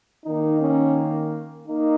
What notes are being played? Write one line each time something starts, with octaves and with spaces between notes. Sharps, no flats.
D#3 A#3 D#4
C#4
A#3 D#4